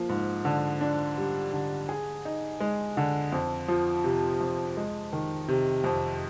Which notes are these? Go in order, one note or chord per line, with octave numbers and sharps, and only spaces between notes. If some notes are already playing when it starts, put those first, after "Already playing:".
Already playing: F3 A#3 F4
G#2
D3
D4
G3
D3
G#4
D#4
G#3
D3
F2
F3
C3
F2
G#3
D#3
C3
F2